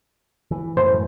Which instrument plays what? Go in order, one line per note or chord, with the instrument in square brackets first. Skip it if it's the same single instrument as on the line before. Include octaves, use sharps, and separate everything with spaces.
[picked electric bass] E3
[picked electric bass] F#2 A2 E3 [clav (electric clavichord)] C5